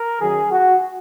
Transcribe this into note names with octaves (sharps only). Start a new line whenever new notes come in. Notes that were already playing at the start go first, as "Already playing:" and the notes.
Already playing: A#4
F#2 D#3 F#3 G#4
F#4